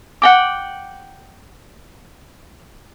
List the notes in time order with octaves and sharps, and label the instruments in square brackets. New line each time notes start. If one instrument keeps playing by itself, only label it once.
[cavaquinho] F#5 G5 D6